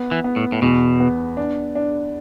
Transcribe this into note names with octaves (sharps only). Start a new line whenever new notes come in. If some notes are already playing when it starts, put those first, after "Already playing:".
Already playing: B3
E3
B3
A2
A2
E2 B2
B3
D4
D4